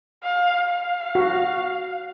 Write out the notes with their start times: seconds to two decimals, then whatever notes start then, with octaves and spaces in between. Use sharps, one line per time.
0.24 F5
0.71 F5
1.15 F#4